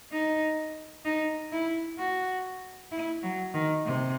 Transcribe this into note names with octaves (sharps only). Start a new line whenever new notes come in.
D#4
D#4
E4
F#4
E4
F#3
D#3
C3